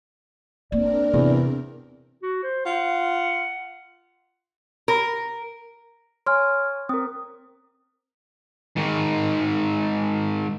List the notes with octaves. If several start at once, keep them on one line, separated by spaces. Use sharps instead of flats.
A#3 C4 D4 A#4 D5
E2 C3
F#4
C5
F4 F#5
A#4
C#5 G#5 C6 F6
C4 A#4 D#6
G#2 D#3